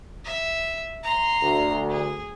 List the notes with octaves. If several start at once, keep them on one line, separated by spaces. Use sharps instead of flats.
E5
A#5 C6
D2
G#4